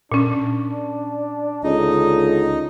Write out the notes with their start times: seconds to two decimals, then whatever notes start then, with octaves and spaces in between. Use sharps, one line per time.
0.12 A#2 C#4 D4
1.64 C#2 D3 D#4 D#5